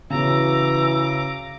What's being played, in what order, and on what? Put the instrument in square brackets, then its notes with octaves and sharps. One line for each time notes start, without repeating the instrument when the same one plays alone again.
[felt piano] C#3 F#4 [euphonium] E3 [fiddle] A#5 D6 [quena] E6